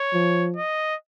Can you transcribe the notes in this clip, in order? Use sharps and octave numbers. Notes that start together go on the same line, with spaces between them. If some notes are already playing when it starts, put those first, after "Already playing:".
Already playing: C#5
F3
D#5